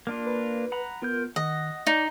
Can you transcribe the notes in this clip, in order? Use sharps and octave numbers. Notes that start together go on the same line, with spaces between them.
A#3 D4 F4
B4
F#5 A#5 B5
B3 F4 A#4 G6
D#3 D#5 F#5
D#4 D5